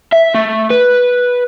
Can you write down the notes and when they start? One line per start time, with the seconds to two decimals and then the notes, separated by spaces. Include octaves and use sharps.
0.13 E5
0.35 A3
0.71 B4